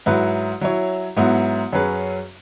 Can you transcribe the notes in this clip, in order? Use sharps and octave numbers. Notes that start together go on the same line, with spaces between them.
G#2 F#3 E4 B4
F#3 E4 C#5
G#2 F#3 B3 E4
F#2 F#3 C#4 G#4 B4